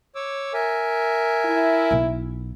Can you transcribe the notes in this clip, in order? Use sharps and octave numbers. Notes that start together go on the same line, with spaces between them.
C#5 D6 E6
A#4 E5 G#5
E4
B1